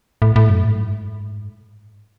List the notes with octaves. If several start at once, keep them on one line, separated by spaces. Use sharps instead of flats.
A2
A2
F#2
G#2